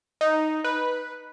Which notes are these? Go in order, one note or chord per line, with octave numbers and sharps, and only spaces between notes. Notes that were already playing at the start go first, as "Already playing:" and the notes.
D#4
B4